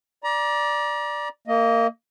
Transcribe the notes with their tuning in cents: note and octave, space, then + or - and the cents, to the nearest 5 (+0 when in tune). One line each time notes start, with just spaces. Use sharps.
D5 +0 A#5 +35
A#3 -20 D#5 +5